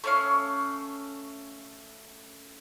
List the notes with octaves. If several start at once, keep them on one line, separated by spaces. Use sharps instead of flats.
A3 C#4 F5